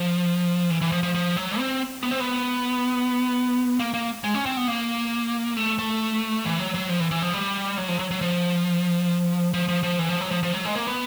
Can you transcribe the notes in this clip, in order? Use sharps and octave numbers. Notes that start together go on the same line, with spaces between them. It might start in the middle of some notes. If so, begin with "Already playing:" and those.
Already playing: F3
E3
E3
F3
F3
F3
F#3
C4
B3
C4
B3
A#3
A#3
G#3
C#4
C4
B3
A#3
A3
A3
E3
F#3
F#3
F3
E3
E3
F3
G3
F#3
F3
F#3
F#3
F3
F3
F3
F3
E3
F3
F#3
F3
F3
F#3
G#3
A#3
B3